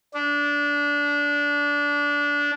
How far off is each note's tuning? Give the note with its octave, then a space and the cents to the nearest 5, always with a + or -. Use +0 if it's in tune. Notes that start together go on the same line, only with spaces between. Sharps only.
D4 -20